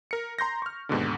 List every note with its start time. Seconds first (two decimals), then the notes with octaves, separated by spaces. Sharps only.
0.11 A#4 C#7
0.39 A#5 C6 G6 A#6
0.62 C#6 F6
0.89 D#2 G#2 B2 D3